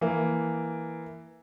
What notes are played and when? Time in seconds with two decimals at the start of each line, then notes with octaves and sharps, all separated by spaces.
0.01 E3 A#3